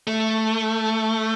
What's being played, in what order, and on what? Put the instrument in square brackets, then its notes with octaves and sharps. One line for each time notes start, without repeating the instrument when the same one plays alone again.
[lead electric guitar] A3